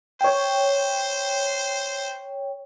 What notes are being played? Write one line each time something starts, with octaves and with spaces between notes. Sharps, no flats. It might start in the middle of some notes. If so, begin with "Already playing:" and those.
C5 C#5 G5